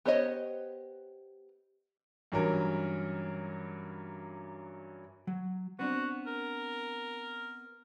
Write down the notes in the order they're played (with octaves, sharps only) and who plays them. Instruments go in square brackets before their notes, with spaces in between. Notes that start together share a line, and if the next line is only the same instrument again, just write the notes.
[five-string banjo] B3 G4 C5 C#5 D#5
[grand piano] G2 E3 F#3 C#4 A#4
[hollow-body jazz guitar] F#3
[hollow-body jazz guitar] B3 C4 D4 [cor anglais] F#4
[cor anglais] A#4